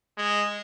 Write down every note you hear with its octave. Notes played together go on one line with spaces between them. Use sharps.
G#3